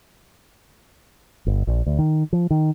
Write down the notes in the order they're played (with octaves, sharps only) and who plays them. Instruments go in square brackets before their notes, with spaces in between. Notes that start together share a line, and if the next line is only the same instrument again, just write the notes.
[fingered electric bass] G1
A#1
D2
D#3
F3
D#3